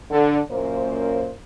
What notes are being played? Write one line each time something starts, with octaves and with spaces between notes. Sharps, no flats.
D3
F#2 A#2 A#3 C#4 C5